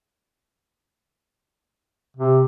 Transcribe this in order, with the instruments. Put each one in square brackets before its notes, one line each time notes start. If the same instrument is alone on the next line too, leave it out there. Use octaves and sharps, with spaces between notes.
[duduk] C3